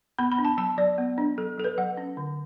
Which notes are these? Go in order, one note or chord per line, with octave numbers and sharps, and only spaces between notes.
B3 B5
B5
D4
A5
F#3 A5
F#3 D5
B3
D4
F#3 A4
F#3 A4
B4
F#3 F#5
C#4
D3